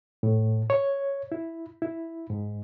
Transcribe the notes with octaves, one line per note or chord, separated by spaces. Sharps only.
A2
C#5
E4
E4
G#2